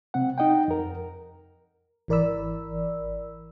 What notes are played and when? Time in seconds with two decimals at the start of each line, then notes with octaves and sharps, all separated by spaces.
0.14 C3 C4 F#5
0.38 D#4 D#5 F#5 G5
0.68 F2 A#4
2.08 G#1 E3 A#4 D5 B5 E6